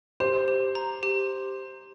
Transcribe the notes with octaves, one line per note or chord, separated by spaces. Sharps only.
G4 C5
G4
A#5
G4